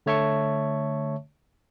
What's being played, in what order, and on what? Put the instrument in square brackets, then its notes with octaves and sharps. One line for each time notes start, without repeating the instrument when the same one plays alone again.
[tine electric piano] D3 A3 C#5 E5 A5 C#6